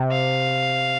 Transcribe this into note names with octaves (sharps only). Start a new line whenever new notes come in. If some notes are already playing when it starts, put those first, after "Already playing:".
Already playing: C3
F5